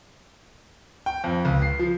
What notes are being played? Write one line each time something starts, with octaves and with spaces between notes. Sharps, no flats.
G5
F2
C#2
C7
F3